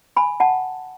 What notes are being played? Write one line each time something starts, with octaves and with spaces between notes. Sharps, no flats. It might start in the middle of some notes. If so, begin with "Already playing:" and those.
G#5 B5
F#5 A5